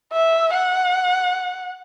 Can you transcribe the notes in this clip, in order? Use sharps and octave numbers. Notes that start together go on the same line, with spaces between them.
E5
F#5